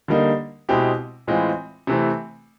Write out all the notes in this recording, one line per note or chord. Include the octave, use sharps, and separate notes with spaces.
D3 G3 A#3 D#4
B2 G#3 C4 E4 G4
A2 E3 G#3 C4 F4
C3 E3 A3 C4